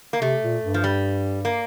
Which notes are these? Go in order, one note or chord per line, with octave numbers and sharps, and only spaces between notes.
A#3
C3 A3
A#2
G2
F3
G3
A#3